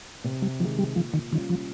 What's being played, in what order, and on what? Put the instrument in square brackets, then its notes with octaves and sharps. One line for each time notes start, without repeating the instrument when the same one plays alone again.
[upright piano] C3
[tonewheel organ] G3
[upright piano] D#3 G#3 [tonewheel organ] F3
[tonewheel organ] G3
[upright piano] A#2 [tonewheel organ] F3
[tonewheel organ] D#3
[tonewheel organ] D#3 [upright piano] G3 C#4 F4
[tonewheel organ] F3